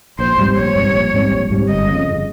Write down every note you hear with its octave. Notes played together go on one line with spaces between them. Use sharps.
A#1 C5
G#2 G3 C4
A#1 C#5
G#2 G3 C4
A#1
G#2 G3 C4
A#1
G#2 G3 C4
G1 D#5
F2 C#3
G1